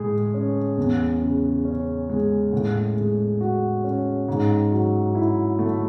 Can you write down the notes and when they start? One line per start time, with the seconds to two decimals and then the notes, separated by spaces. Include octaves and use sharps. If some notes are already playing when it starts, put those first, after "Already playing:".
Already playing: A2 G#3 G#4
0.34 C#4
0.77 E2
1.21 C#3
1.65 C#4
2.09 G#3
2.53 A2
2.97 G#3
3.41 F#4
3.84 C#4
4.28 G#2
4.72 F#3
5.15 E4
5.59 A3